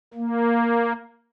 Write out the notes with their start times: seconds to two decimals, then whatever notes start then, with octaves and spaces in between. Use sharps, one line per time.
0.14 A#3